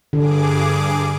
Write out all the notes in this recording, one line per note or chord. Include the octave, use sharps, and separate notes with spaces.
G2 D3 G#4 D6